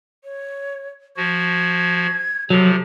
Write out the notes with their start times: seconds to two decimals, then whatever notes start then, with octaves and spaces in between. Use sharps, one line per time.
0.24 C#5
1.17 F3 F#4 G#6
2.50 C3 F3 F#3 A4